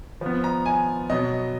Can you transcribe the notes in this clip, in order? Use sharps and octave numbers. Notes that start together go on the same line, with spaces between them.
F3 B3
A#5
G#5
B2 F#3 B3 D#5